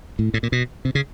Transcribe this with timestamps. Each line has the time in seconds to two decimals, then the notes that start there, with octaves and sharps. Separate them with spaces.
0.19 A2
0.34 A2
0.43 A#2
0.52 B2
0.85 C3
0.95 C#3